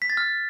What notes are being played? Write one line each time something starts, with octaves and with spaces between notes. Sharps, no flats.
B6
A6
F6